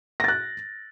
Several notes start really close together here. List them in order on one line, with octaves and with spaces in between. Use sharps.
A#6 A6 F#6